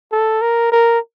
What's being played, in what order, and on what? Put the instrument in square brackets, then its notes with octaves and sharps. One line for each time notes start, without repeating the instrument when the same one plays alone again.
[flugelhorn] A4
A#4
A#4